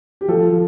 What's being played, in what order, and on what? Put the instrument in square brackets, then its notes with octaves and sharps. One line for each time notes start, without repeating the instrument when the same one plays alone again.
[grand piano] G4
F3 A4